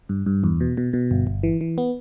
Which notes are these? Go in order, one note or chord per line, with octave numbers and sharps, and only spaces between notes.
G2
G2
E2
B2
B2
B2
G1
G1
E3
E3
B3